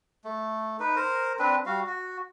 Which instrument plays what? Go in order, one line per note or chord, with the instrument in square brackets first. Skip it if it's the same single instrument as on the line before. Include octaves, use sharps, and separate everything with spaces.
[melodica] A3
D#4 B4
A#4 C5
C4 D4 B4
G3 F#4 F5
F#4